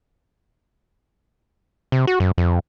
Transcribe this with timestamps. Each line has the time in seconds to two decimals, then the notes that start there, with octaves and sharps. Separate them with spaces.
1.92 C3
2.07 F#4
2.20 F#2
2.38 F2